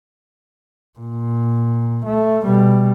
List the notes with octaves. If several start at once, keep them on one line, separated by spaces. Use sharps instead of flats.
A#2
A3
B2 G3